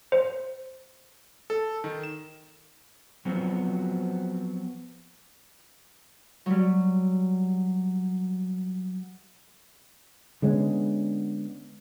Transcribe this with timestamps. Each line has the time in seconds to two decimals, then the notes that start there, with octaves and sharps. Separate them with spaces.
0.12 C5
1.50 A4
1.84 D#3
2.03 E7
3.25 F3 F#3 B3 C4 F#4
6.46 F#3 G3
10.42 D3 G#3 B3 C#4